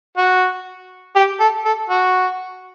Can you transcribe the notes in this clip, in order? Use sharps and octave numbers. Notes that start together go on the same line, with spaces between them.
F#4
G4
A4
A4
F#4